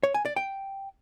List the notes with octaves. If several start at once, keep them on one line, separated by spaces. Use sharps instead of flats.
C#5
G#5
D5
G5